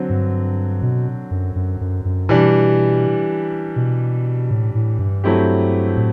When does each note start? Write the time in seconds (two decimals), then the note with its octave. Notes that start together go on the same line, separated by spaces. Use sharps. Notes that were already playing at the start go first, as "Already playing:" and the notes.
Already playing: D3 F#3 C4
0.09 G2
0.82 B2
1.31 F#2
1.56 F#2
1.81 F#2
2.05 F#2
2.29 B2 E3 G3 D4
3.76 B2
4.51 A2
4.75 A2
4.99 G2
5.24 F#3 A3 C4 E4 G4
5.97 A2